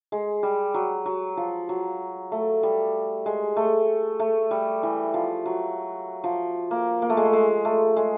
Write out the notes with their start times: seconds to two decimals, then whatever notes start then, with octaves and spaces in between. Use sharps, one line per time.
0.12 G#3
0.43 G3
0.74 F#3
1.06 F#3
1.37 F3
1.69 F#3
2.32 A3
2.63 G3
3.26 G#3
3.57 A3
4.20 A3
4.51 G3
4.83 E3
5.14 F3
5.46 F#3
6.24 F3
6.71 A#3
7.02 A#3
7.10 A3
7.17 G#3
7.25 A3
7.33 G#3
7.65 A3
7.96 G#3